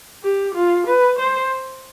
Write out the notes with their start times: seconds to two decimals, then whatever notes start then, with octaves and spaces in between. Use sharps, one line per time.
0.23 G4
0.55 F4
0.87 B4
1.19 C5